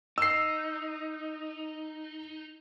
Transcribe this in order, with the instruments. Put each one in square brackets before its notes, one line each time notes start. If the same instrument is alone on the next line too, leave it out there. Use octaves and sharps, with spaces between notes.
[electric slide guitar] D#4 [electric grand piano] E6 C7